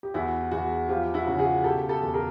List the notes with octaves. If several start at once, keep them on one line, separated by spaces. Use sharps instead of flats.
G4
E2 E4 F#4
E2 F#4 G#4
F3 F4 G4
E4 F#4
C#3
F#4 G#4
B2 G4 A4
G4 A4
E2
G#4 A#4